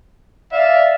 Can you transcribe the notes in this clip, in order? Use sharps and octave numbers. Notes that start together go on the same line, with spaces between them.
D5 E5 F5